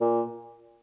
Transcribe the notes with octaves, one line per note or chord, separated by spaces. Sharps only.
A#2